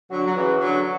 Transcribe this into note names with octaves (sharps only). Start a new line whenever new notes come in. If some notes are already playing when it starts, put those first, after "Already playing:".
D3 F#3 F#4
F#3
C#3 E3
D3 F#3